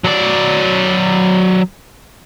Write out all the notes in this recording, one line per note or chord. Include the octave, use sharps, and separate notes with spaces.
F#3 D5